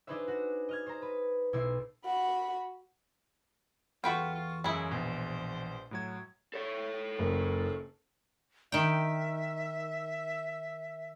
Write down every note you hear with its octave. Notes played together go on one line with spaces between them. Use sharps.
D4 D#4 G#4 B4 C5 E5
F#4
D#5 F6 G#6
C5 A#5
B4
B1 E4 E5 C6
F#4 B5
E2 F4 F#4 A4 B4 G5 C6 C#6
F4
F#2 C#3 G#3 E4
A#1 B2 C5
A2 F#3 G#6
A4 C#5
F#1
D#3 E5 G5